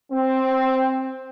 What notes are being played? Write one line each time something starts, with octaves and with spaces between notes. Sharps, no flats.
C4